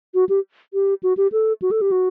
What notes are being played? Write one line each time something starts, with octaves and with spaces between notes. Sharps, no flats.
F#4
G4
G4
F#4
G4
A4
F#4
A4
G4
F#4